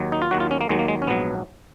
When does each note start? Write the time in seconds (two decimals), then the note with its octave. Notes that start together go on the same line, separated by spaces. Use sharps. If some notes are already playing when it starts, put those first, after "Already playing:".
Already playing: D#2 D#3 F#3
0.12 D#4
0.22 F4
0.31 D#2 D#3 F#3 F#4
0.40 F4
0.51 C#4
0.61 A#3
0.69 D#2 D#3 F#3 G#3
0.79 A#3
0.88 G#3
1.02 C#4
1.07 A#1 G#2 F#3 B3